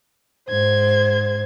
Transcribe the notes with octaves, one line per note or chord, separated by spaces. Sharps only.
G#2 C5 G#6